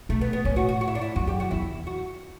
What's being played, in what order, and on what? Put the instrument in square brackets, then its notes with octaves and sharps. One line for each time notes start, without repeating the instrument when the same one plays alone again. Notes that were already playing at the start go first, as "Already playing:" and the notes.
[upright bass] B2 [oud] A3
[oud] B3
B3
[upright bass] A2 [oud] C#4
[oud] F#4
F#4
F#4
E4
D4
E4
[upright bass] F#2 [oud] F#4
[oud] G4
F#4
[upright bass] E2 [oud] E4
[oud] F#4